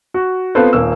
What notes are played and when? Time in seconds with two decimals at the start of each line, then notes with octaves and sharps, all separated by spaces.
0.14 F#4
0.55 B3 C4 F4 A4 B4 C5
0.73 D#1 A#3 E6